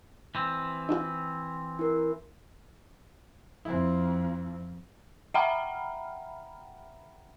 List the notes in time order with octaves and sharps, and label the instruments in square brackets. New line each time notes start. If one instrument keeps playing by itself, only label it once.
[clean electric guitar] E3 C4
[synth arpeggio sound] D4 D#4 F4
[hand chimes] E4 A#4
[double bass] F2 [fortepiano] C4 E4
[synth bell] E5 F#5 G5 A#5 B5 F6